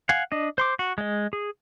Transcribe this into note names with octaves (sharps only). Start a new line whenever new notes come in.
F5 F#5 G#5
D4 D#5
C5 C6 D6
F#4
G#3 D#5
G#4